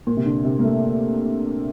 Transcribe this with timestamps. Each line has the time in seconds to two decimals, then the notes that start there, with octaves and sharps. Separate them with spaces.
0.07 A#2
0.17 C3
0.26 D3
0.45 C3
0.59 A#3
0.64 A3